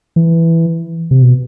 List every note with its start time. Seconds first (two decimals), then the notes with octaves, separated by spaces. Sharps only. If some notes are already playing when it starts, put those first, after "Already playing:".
0.16 E3
1.11 C3
1.22 B2